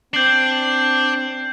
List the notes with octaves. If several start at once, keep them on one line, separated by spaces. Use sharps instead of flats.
C4 D4 G6 C7